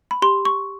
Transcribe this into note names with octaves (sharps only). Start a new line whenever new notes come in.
B5
G4 C6
C#6